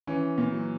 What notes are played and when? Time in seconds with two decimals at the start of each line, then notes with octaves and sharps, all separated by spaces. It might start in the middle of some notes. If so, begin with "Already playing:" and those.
0.07 E3 C#4
0.38 A#2
0.52 F#3